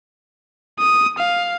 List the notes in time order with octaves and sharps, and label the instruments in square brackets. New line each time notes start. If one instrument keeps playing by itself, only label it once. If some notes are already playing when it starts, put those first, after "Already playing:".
[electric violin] D#6
F5